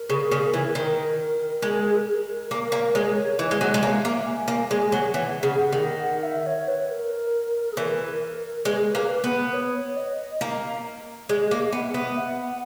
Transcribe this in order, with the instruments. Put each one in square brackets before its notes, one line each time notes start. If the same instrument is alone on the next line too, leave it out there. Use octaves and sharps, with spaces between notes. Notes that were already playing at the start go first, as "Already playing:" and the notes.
Already playing: [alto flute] A#4
[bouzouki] C#3
C#3
E3
D#3
G#3
[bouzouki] A#3 [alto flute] A#4
[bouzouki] A#3
[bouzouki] G#3 [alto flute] C#5
[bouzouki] E3 [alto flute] D#5
[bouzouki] G#3
F#3
G#3
[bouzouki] A#3 [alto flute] E5
[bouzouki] A#3
[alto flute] G#5
[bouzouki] A#3
[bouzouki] G#3 [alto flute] G#5
[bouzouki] F#3
[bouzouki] E3 [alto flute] F#5
[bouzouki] C#3
[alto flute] F#5
[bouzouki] D#3
[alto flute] F#5
E5
C#5
B4
A#4
G#4
[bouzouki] E3 [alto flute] A#4
[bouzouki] G#3 [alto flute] B4
[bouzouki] A#3
B3
[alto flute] C#5
D#5
[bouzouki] A#3
[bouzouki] G#3 [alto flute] D#5
[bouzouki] A#3
[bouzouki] B3 [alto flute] E5
[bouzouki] B3
[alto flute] F#5